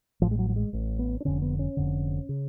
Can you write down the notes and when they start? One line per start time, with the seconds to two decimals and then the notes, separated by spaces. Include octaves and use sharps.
0.21 A1 A2 F3
0.31 G#3
0.39 F#3
0.49 F#3
0.56 G#3
0.73 A1 A2
0.99 B3
1.20 D4
1.25 F1 F2 D3 C#4
1.42 B3
1.59 C#4
1.77 F1 F2 D3
2.29 C#3